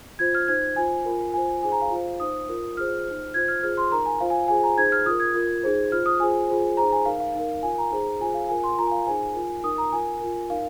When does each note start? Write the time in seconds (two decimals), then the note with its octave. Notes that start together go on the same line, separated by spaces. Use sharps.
0.19 F4 C5 G#6
0.34 F6
0.48 D#4 C5 G#6
0.76 F4 C5 G#5
1.05 F4 A#4
1.34 F4 C5 G#5
1.63 D#4 G#4 C5 G#5
1.72 A#5
1.82 F5
1.91 F4 C5
2.20 D#4 C5 D#6
2.49 F4 A#4
2.77 F4 G#4 C5 F6
3.05 C5
3.10 D#4
3.34 F4 C5 G#6
3.48 F6
3.63 F4 G#4 C5 F6
3.77 C6
3.92 D#4 A#4 A#5
4.06 G#5
4.20 F4 C5 F5
4.30 G#5
4.48 F4 G#4 C5 G#5
4.63 A#5
4.77 D#4 G#4 C5 G#6
4.92 F6
5.06 F4 A#4 D#6
5.20 G#6
5.34 F4 A#4
5.64 D#4 G#4 C5
5.92 F4 C5 F6
6.06 D#6
6.20 F4 G#4 C5 G#5
6.48 F4 G#4 C5
6.77 D#4 G#4 C5 A#5
6.92 G#5
7.06 D#4 A#4 F5
7.20 F5
7.35 D#4 A#4
7.63 F4 A#4 G#5
7.78 A#5
7.91 D#4 G#4 C5
8.20 F4 G#4 C5 G#5
8.34 F5
8.49 F4 A#4 G#5
8.63 C6
8.78 F4 A#4 A#5
8.87 G#5
8.91 F5
9.06 D#4 G#4 C5 G#5
9.34 F4 A#4
9.64 D#4 A#4 D#6
9.78 A#5
9.92 F4 A#4 G#5
10.20 F4 A#4
10.50 D#4 A#4 F5